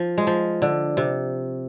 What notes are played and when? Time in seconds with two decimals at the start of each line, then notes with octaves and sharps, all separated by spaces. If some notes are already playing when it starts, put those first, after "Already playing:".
Already playing: F3
0.18 G#3
0.27 F3
0.62 D3
0.97 C3